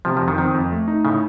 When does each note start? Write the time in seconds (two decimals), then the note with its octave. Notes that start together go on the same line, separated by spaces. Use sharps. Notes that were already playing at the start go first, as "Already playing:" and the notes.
0.05 C3 F3
0.17 F3
0.22 F2
0.28 D#3
0.38 D#3 C4
0.54 F2
0.72 A3
0.88 D#4
1.04 A2 C#3